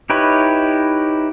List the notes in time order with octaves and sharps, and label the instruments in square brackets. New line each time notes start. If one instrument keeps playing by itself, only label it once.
[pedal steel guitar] D#4 E4 G4 B4 C#5